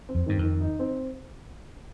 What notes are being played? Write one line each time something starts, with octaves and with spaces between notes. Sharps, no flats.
C4
F2
G2 D#3
F2 D#3
D#4
C4